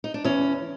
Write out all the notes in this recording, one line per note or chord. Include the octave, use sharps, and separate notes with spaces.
D#4
D4
E2 C#4